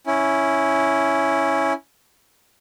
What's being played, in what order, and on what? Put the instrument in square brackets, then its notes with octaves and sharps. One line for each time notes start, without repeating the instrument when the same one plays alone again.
[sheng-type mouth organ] C#4 E4